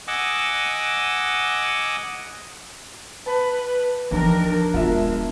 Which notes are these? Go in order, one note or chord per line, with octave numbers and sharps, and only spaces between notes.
D#5 F#5 G#5 D6 E6
B4 A5
D#2 E3 F3 D4 A#4
D#1 G#3 B3 F4 A#4 E5